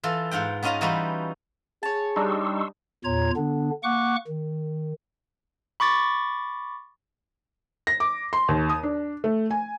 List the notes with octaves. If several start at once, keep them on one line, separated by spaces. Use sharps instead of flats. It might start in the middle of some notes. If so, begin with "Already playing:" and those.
E3 F4 A4
G#2 F4 F#5 G5
B3 C#4 D#4 F4 F5 A#5
E3 G3 D#4 F4 F#4 B4
G#4 C#5 A5
G3 D4 D#4 C6 C#6 E6
E2 A#2 F4 C#5 A#5 G#6
D3 B3 D4
A#3 F#5 C#6 D6 F#6
D#3
B5 C#6 D6 A6
A#6
D6
C6
D#2
D#6
D4
A3
G#5